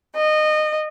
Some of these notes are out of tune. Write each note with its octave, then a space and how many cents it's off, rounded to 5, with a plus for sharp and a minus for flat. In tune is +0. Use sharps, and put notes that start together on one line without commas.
D#5 -20